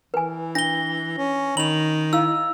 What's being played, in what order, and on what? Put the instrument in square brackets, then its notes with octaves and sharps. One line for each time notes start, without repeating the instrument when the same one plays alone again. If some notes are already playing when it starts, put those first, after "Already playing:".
[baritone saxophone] E3 [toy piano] B4 G#5
[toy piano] D4 [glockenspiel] A#6 G7
[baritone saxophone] C#4
[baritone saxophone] D#3 [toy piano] B5 [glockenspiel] F7 F#7
[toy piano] E4 F5 [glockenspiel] E6